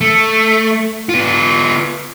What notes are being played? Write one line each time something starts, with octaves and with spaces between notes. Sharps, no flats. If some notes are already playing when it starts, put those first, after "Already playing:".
A3
B3 F4